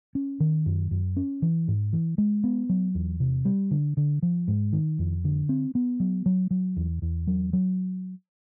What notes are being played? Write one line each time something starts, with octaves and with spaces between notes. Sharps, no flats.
C#4
D#3
F#2
F#2
C#4
E3
G#2
E3
G#3
B3
F#3
E2
C3
G3
D3
D3
F3
G#2
D#3
F2
D3
C4
B3
F#3
F#3
F#3
E2
E2
F#3
F#3